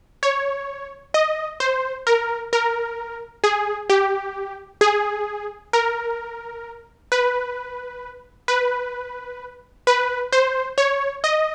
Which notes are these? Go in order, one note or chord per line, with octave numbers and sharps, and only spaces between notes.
C#5
D#5
C5
A#4
A#4
G#4
G4
G#4
A#4
B4
B4
B4
C5
C#5
D#5